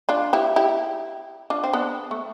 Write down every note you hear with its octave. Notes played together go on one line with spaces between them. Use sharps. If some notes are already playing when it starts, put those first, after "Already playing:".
D4 F4
E4 G4
E4 G4
D4 F4
C4
B3 D4
A3